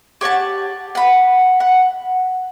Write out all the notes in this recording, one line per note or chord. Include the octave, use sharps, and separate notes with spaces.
G4 C#5 F#5 A5
F#5 B5
F#5